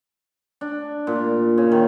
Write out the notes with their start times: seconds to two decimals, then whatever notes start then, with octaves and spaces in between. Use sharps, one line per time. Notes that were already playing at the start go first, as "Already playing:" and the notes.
0.61 D4
1.07 A#2
1.58 C#3
1.72 D#3